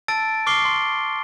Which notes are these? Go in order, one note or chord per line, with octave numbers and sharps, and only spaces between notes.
A5 E6 A6 D7
C#6 D6 F6 C7 G7
C6